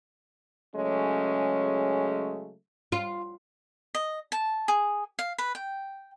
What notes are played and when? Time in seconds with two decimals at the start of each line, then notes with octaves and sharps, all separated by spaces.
0.76 C#3 F#3 G#3 A3 C#4
2.92 F4
3.95 D#5
4.32 A5
4.68 G#4
5.19 F5
5.38 B4
5.55 G5